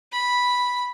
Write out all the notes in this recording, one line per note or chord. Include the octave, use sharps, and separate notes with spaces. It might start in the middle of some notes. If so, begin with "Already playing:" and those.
B5